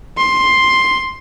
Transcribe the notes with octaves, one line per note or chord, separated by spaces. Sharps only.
C6